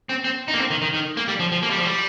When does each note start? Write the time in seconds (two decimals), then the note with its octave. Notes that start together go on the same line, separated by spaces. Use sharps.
0.09 C4
0.24 C4
0.48 D#4
0.54 A#3
0.58 C4
0.71 D#3
0.82 D#3
0.94 D#3
1.17 A#3
1.28 G3
1.40 F3
1.52 F3
1.63 A#3
1.70 G3
1.78 F3
1.85 G3